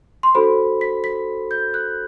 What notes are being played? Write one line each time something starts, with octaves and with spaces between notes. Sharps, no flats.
C6
D4 F#4 A4 C5 B5
B6
B6
G6
F#6